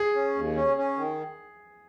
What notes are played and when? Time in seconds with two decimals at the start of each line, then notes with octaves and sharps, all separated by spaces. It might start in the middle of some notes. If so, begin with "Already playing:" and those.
Already playing: G#4
0.15 C#4
0.35 D#2
0.56 C#4
0.77 C#4
0.97 D#3